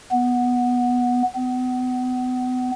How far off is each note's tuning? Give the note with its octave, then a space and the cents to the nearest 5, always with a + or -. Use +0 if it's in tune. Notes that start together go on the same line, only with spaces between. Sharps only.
B3 -5
B3 +35